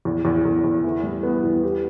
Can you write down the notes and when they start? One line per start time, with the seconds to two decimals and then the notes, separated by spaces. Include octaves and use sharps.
0.05 E2
0.25 E2
0.45 E2
0.64 E2
0.84 E3
1.03 G3
1.23 B3
1.44 E2
1.63 G4